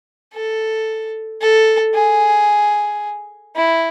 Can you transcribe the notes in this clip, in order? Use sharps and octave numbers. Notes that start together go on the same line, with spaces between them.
A4
A4
G#4
E4